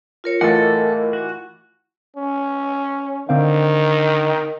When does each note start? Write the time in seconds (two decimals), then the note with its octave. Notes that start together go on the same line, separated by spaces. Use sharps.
0.24 F4 A#4 C#5
0.41 A2 E3 F4 A4 A#4 D#5 F#5
1.13 F#4
2.16 C#4
3.29 D3 D#3 C4 F5